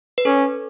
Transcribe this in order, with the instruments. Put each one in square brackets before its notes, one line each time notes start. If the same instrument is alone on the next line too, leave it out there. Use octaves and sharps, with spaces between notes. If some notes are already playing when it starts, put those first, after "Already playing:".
[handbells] B4
[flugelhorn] C#4 [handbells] A4